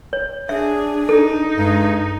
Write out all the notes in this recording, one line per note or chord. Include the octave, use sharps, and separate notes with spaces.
C#5
D4 G#4 E5
D#4 A4
G2 G#3